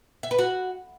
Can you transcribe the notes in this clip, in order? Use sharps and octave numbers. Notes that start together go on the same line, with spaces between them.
E5
B4
F#4